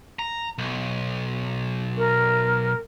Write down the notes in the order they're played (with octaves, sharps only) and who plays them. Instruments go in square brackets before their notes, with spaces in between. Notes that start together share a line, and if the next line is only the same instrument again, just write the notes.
[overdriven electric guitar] A#5
B1
[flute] A#4